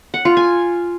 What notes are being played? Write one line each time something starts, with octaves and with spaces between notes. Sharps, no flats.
F#5
F4
G#5